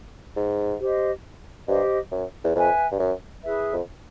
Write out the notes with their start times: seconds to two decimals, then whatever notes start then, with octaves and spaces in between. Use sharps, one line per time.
0.36 G#2
0.80 G4 C5 D#5
1.67 G2 G4 C5 D#5
2.11 F#2
2.44 E2
2.55 F2 B4 E5 G#5
2.92 G2
2.99 F#2
3.43 E4 G#4 B4 E5
3.73 F2